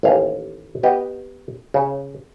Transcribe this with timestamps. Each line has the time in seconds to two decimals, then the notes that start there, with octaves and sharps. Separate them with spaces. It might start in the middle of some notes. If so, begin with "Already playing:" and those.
0.03 A1 D#2 F5 G#5
0.83 B3 G4 D#5
1.74 C#3